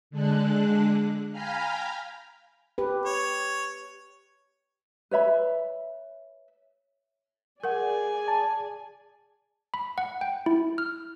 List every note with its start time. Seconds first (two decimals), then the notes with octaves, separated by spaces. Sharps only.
0.11 D3 G#3 D4 F#6
1.32 F5 G5 G#5 A#5 B5 F6
2.78 G4 B4
3.06 C#5
5.11 B4 C#5 E5 B5
7.64 G#4 A#4 D5 F#5 G#5
8.28 A5
9.74 B5
9.98 F#5
10.21 G5
10.46 E4
10.78 F6